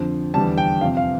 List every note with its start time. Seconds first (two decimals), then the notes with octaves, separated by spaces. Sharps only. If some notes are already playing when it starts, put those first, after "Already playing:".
Already playing: F2 D3 F3
0.34 E2 D3 G3 A5
0.58 G5
0.81 F2 C3 F3 F5
0.97 F5